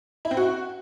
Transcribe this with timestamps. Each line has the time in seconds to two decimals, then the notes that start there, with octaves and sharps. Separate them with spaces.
0.25 E4
0.31 C4
0.37 F#4